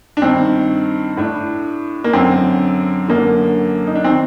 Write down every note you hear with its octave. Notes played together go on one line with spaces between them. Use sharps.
D4
G2 D#3 C4
A2 D4
A#3
F#2 D3 C4
F#2 D3 A#3
D#4
D4
D#3 C4